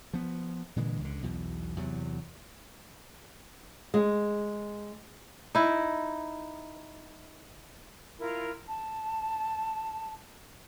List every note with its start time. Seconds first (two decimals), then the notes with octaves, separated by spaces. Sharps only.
0.13 F3 B3
0.76 A#2 D3 E3 G#3
1.01 C#2 D3
1.23 B1 E2 B2
1.76 E2 C3 F#3
3.94 G#3
5.55 D#4 E4
8.19 E4 F4 A#4
8.68 A5